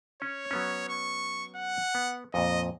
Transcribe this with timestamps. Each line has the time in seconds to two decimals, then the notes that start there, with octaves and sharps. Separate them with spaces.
0.22 C#4 C#5
0.51 F#3 B3 C#4
0.89 C#6
1.55 F#5
1.95 B3
2.34 F2 A#2 D#5